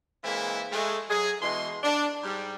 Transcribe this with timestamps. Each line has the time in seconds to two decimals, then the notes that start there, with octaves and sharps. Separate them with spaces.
0.24 E3 G#3 A#3 C4 E4
0.72 G#3 A3
1.09 F#3 G#4
1.41 B2 E3 G#3 C6
1.83 D4
2.23 G#2 G3